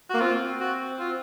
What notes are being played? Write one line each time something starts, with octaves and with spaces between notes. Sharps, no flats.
A#3 F#4
C4 F4
F#4
F4